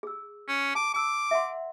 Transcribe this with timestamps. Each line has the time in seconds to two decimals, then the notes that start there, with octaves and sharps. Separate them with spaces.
0.03 G#4 E6
0.48 C#4
0.75 A5 D6
0.94 A5 D6 E6
1.31 E5 F#5 C6